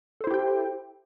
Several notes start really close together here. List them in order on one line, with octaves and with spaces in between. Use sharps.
A4 C5 E4 G4 G5